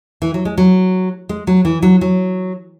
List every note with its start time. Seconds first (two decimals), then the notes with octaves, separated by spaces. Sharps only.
0.22 E3
0.34 F#3
0.45 G#3
0.58 F#3
1.29 G#3
1.47 F#3
1.65 E3
1.83 F#3
2.01 F#3